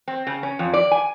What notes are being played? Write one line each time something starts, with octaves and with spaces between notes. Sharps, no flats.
C4
C#3
C#4
F2
D5
G#5